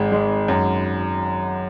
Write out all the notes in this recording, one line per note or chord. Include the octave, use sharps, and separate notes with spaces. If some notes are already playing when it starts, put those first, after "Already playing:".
Already playing: G#1 G#3
G#3
F#2